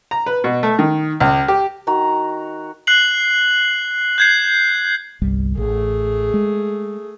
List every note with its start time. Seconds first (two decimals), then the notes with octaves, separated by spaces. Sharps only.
0.11 A#5
0.26 B4
0.44 B2
0.63 A3
0.79 D#3
1.20 C#2
1.48 G4
1.87 D#3 F#4 A#5
2.87 F#6 C7 F#7
4.18 G6 G#6 C7
5.22 G1 C2 G3
5.57 A1 A3 G#4
6.34 G#3